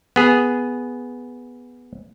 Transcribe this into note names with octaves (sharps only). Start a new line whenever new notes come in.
B3 G#4